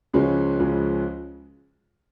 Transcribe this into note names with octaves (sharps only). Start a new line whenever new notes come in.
C#2 C#3 F3 G#3 C#4
C#2 C#3 F3 G#3 C#4